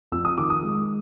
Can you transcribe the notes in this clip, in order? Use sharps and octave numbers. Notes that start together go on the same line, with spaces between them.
F2 E6
D#6
D#3 D6
D#6
G#3